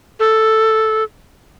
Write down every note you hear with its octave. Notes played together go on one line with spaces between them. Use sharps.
A4